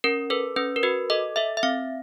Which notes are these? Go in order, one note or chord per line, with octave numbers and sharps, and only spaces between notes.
C#4 A#4
A4 B4
C#4 B4
A#4
F#4 B4
A4 D#5
A4 E5
E5
C4 F5